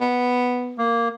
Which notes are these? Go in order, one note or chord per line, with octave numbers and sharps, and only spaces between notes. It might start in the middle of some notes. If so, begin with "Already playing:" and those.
B3
A#3